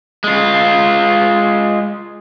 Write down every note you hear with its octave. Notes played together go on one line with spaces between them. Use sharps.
G#3 F4